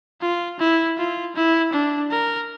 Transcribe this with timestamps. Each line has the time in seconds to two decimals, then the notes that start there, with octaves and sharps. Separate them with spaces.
0.22 F4
0.60 E4
0.98 F4
1.36 E4
1.73 D4
2.11 A#4